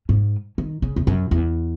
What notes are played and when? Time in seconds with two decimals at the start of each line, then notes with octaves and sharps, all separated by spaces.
0.09 G#2
0.58 D#3
0.82 C#3
0.96 E2
1.07 F#2
1.31 E2